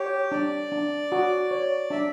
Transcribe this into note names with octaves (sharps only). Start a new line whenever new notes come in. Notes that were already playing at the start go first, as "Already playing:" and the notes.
Already playing: G4 C#5
D4 D5
D4
F#4
C#5
D4 E5